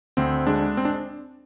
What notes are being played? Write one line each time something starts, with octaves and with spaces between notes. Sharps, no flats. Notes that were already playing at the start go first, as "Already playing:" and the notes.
D2 C4
G#3 D4
C4
D4